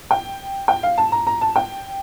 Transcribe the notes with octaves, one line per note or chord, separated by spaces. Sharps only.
G5
G5
F5
A5
A#5
A#5
A5
G5